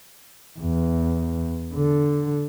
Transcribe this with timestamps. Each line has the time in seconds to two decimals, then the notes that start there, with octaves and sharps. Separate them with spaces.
0.59 E2
1.75 D3